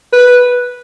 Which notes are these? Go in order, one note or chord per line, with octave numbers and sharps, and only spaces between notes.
B4